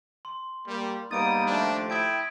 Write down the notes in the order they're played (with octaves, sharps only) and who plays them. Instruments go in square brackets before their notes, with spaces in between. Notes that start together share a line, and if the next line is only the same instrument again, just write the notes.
[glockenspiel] C6
[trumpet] G3 [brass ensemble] A#3
[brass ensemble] G#2 B3 [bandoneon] G3 A#3 D#4 [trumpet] D#6 [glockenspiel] A6 D7
[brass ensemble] D#2 F3 A3 [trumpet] D4
[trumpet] E4 [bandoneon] G5 [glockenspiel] D#6 G#6 D7